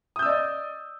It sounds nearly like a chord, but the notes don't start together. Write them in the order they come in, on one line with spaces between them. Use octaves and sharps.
D#6 G6 E6 D5 D#5